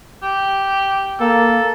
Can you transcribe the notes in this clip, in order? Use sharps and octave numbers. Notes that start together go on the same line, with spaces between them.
G4
A#3 A4